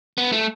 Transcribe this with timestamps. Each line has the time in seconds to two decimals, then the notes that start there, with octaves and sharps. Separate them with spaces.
0.18 B3
0.32 A3